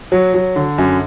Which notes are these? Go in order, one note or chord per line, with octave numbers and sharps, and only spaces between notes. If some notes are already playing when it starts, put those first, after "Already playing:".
F#3
F#3
D3
F#2